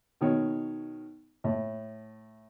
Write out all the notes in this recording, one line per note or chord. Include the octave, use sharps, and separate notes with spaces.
B2 D#3 C#5
A2